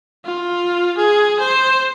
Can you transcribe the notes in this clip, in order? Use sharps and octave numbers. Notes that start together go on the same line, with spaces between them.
F4
G#4
C5